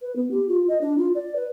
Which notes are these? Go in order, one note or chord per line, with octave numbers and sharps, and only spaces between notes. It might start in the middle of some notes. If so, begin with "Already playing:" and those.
B4
B3
G4
F4
D#5
D4
F4
D5
B4